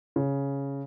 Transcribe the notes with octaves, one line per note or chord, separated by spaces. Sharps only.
C#3